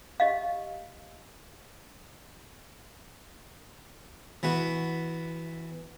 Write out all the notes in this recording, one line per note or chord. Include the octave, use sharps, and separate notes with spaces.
G4 D#5 F5
E3 B3 F#4